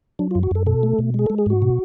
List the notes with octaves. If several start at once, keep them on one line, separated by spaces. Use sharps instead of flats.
F#3 D4
F4
F#2
F#4
F#2 A4
B2 A4
A3
B2
G#3 G#4
A4
G#3
G#4
G#2 F#4
B2